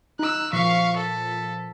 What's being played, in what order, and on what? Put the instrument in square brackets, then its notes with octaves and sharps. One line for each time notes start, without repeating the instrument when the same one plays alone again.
[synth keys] D#4 [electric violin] E6 F#6
[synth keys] A#2 F3 B6 [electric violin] F5 C#6
[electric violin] A4